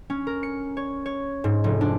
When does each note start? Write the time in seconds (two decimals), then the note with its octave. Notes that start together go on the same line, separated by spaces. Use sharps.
0.10 C#4
0.27 A#4
0.43 C#7
0.77 C#5
1.06 C#5
1.44 G#2
1.64 F1
1.81 D4